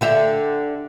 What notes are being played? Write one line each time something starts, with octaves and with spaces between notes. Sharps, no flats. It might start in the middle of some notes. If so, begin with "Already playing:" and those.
D3 G4 E5